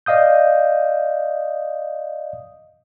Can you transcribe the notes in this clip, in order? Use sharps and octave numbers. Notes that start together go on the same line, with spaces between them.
D5 D#5 F5 D#6 G6